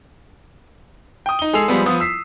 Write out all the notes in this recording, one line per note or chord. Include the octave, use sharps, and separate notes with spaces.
G5 D#6
D#4 G7
G#3 G#4 A4 E6 C7 F7
F3 G3 G#3 B3
F3 B3 D#6
E6 B6 C7